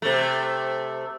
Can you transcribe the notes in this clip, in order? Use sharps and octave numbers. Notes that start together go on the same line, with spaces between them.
C3 A3